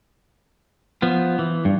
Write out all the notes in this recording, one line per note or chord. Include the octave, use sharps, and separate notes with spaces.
F3 B3
E3
G2